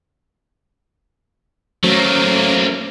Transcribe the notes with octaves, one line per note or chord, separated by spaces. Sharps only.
F#3 A3 A#3 C#4 C5